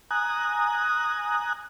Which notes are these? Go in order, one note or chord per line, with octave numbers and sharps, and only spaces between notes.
G#5 A#5 D#6 F#6